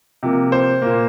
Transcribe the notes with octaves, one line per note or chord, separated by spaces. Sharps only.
C3 F3 A#3
C5
A#2 A#3